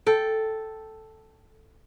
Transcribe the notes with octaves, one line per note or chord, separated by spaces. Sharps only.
A4 G5